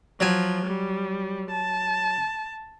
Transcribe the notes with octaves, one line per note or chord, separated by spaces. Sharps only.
F3 F#3 G#5
G3
A5